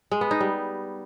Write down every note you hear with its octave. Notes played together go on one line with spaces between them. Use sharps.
G#3
B3
D#4
G3